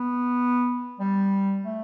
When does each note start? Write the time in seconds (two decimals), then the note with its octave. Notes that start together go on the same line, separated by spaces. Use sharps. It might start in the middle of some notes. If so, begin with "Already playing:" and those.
Already playing: B3
1.00 G3
1.65 A3